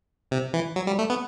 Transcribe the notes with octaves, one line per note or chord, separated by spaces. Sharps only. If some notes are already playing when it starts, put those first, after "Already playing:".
C3
E3
F#3
G3
A3
B3